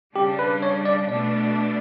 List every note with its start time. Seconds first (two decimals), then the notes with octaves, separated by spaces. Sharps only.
0.15 C#3 G3 D4 G4
0.39 B4
0.62 C#5
0.85 D5
1.08 B2 A3 D4 D5